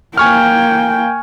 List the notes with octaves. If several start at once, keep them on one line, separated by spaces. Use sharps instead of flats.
A#3 G5 G#5 C#6 F6